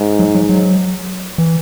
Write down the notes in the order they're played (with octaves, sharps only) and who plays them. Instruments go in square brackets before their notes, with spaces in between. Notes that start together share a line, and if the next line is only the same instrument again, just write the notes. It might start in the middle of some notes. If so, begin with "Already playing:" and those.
Already playing: [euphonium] G#2
[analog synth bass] F#3
F#3
F#3
E3